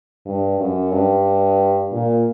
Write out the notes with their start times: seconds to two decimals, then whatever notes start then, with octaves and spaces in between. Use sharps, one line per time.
0.26 G2
0.59 F#2
0.92 G2
1.92 A#2